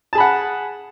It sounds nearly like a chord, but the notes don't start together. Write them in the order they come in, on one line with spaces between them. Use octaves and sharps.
A5 G#4 B5 F#5